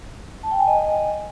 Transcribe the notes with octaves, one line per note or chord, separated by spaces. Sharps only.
A5
G5
G#5
D#5